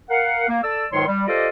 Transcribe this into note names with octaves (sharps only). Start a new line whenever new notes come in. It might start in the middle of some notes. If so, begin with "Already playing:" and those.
A#4 F5 F#5
A#3
A4 D5 E6
C#2 G#2 D#3 F#3 C#5 C6
G3
F4 G4 A4 C5 D5 D#5